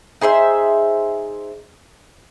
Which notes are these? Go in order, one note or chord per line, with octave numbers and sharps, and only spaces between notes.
D#4 G#4 C5 E5